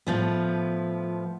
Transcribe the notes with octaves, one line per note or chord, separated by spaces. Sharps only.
A2 F3 B3